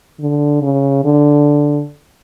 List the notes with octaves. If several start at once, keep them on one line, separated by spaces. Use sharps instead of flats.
D3
C#3
D3